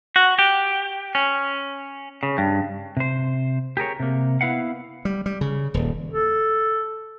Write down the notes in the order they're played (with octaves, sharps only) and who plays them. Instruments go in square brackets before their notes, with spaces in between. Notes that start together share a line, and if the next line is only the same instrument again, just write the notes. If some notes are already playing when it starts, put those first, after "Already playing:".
[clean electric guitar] F#4
G4
C#4
C#3
G2
[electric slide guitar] C3 C5
G4 G#4 A#4 C#5
C3 A#3
B3 E4 B4 F5 F#5
[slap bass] G3
G3
C#3
D#1
[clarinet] A4